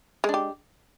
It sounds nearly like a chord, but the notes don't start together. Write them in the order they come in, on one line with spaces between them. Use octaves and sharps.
G#3 D4 G4